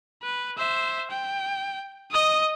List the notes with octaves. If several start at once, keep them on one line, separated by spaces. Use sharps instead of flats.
B4
C5 E5
G5
D#5 D#6